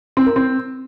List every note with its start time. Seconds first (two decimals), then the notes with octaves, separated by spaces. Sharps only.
0.17 C4
0.26 A#4
0.36 C4